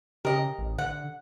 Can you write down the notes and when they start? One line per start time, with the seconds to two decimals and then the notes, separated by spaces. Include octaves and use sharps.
0.25 C#3 G4 A#4 D#5
0.58 A1
0.78 D3 F#5